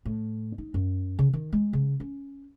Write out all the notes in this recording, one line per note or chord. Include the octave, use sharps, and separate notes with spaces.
A2
D#4
F#2
C#3
D#3
G#3
C#3
C#4